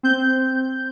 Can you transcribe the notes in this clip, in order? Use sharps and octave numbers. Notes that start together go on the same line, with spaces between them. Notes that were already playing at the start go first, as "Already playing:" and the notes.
C4 G6